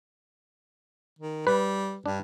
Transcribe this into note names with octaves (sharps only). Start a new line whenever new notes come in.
D#3
G3 B4
G2 D4